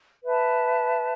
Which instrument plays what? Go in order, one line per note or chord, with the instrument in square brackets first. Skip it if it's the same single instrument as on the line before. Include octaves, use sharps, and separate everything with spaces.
[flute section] B4 E5 A5